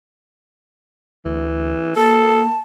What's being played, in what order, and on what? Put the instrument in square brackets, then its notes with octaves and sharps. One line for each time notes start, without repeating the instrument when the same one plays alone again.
[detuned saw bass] D2 [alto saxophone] E3
[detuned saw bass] A#3 [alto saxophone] A4 [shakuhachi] A5